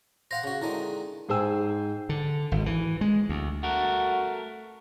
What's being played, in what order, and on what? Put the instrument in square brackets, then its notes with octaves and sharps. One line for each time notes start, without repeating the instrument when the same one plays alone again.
[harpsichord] C5 F5 F#5 [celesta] A#6
[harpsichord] C#3 F#4
[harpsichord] D3 D#3 G#3 [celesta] E4
[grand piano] G#2 G#4 C5 G5 G#5 E6
[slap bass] D3
G#1
E3
G#3
D2
[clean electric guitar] A3 A#4 [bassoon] F#4